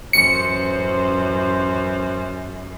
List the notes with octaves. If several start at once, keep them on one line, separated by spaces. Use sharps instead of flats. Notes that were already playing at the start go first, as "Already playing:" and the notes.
A1 F#2 C5 C#7